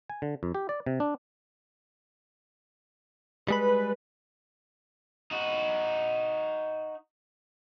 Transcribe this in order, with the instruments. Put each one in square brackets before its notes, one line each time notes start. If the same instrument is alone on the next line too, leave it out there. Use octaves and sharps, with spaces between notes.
[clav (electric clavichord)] G#5
D3
F2
G4
D5
C3
D4
[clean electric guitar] G3 G#3 B5 [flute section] B4
[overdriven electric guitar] D#4 F#4